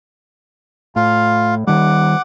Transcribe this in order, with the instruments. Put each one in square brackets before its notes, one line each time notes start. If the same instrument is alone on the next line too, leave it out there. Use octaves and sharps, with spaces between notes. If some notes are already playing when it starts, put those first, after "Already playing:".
[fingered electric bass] A2 [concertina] F4 F5
[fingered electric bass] D#3 G3 [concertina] F#5 D6